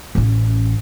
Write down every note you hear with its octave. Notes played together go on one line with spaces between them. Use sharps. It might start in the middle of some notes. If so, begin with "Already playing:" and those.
A1 C#4